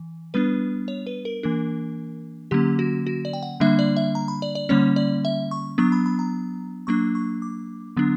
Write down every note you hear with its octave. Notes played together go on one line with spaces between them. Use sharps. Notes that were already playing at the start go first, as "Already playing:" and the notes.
Already playing: E3
G3 B3 D4 B4
C#5
B4
A#4
E3 A#3 D4 A#4
D3 F#3 A#3 C#4 G4
F#4
F#4
D5
G5
F#5
D3 G3 A#3 D4 E5
D5
E5
A#5
B5
D5
D5
D3 G3 A#3 C#4 C#5
D5
E5
C#6
F#3 B3 D4 C#6
B5
B5
A#5
F#3 A#3 D4 C#6
C#6
D6
D3 F#3 B3 D4